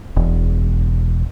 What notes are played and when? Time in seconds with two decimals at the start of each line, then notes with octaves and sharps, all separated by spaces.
0.16 E1